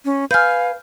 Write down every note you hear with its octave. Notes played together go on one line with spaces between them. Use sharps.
C#4
B4 F5 G#5 F6 G6